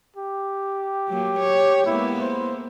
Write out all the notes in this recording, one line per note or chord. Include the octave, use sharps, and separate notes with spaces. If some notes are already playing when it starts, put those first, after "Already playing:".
G4
F#3 A#3
C#5
G#3 A#3 B3 E4
C5